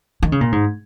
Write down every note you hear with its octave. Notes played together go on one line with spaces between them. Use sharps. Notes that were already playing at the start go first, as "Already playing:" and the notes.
D#3
C#3
A#2
G#2